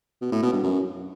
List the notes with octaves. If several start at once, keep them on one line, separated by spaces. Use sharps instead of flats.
B2
A2
B2
G2
F#2